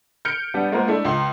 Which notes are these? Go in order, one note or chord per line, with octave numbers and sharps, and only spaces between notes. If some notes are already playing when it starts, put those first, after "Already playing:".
F6 G6 C#7 D7
G3 B3 D4
G#3 A#3 B3 F4 A#4 C5
G#3 A3 D4 E4
C#2 C6